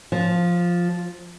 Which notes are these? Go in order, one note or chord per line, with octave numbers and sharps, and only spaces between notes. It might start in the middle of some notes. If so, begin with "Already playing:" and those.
F3